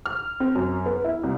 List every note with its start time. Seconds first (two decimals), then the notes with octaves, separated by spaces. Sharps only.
0.06 F6
0.40 C4
0.55 F#2
0.86 B3
1.04 E4
1.23 C2